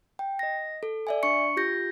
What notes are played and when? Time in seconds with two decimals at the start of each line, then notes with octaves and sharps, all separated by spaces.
0.19 G5
0.39 D#5 A#6
0.83 A4
1.07 D5 E5 G#5
1.23 D4 C#6 C#7
1.57 F4 G4 G6 A#6